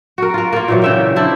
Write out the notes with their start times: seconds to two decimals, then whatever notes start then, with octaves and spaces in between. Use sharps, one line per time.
0.18 F#4 A#4
0.34 F4 A#4
0.53 A#3 F4
0.68 A#2 E3 F#3
0.82 C#3 E5 G5
1.16 D4 E4 C5